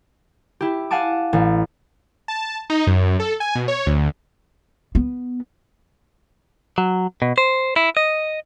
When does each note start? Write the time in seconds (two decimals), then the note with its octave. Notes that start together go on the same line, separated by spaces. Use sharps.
0.61 E4 G4
0.91 F5 F#5 G#5 A5 D6
1.33 A1
2.28 A5
2.70 D#4
2.87 F#2
3.20 A4
3.40 G#5
3.55 B2
3.68 C#5
3.86 D2
4.95 B3
6.78 F#3
7.22 B2
7.38 C5
7.76 E4
7.97 D#5